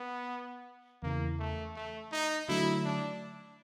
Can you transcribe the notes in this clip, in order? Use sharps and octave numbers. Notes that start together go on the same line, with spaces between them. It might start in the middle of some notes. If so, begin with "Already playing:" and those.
Already playing: B3
E2 C#3 E3 A#3
A3
A3
D#4
D3 F#3 A3 E4
D4